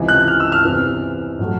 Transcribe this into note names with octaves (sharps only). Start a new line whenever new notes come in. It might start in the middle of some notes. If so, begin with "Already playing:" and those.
Already playing: C#2 C3 E3
F#6
F6
E6
F6
E2 C3 E3
A2 F#3 A3